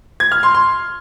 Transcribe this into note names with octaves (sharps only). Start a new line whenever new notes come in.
G#6
F6
C6
C6